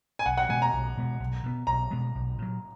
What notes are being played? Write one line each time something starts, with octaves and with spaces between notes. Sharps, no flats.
G#5
B1 F#5
F#5
B2 G#3 B3 G#5
A#5
B1
B2 G#3 B3
B1
B2 G#3 B3
B1 A#5
B2 G#3 B3
B1
A#2 F#3